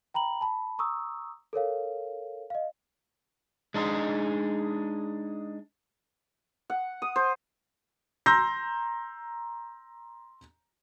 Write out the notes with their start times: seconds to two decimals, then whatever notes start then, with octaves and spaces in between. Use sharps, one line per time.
0.14 G5 A#5 B5 F#7
0.41 A5 B5
0.79 A#5 C#6 D#6 E6
1.53 A4 A#4 C#5 F5
2.50 D#5 F5
3.74 G#3 D4 D#4 G#4
6.70 F#5
7.02 D#6
7.16 C5
8.26 A#5 C6 E6 G6 A#6